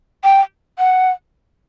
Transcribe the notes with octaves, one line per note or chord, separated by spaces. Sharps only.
G5
F#5